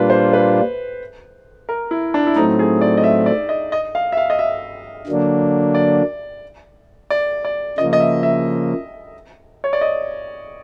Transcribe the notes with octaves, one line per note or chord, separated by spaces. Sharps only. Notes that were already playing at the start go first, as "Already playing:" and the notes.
Already playing: A#2 G3 A#3 D4 F4 B4
C5
B4
A#4
E4
D4
E4
A2 F#3 A3 C4 D#4
G#4
D5
D#5
E5
D5
D#5
D#5
F5
E5
F5
D#5
E5
D3 F#3 A#3 D4
D5
D5
D5
C#3 F3 A#3 D#5
D#5
E5
E5
C#5
D5
D#5